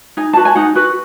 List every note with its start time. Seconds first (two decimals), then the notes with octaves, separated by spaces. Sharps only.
0.17 D#4 G#5
0.33 F#4 B4 A5
0.45 G#5
0.56 D#4 F#5
0.75 F#4 B4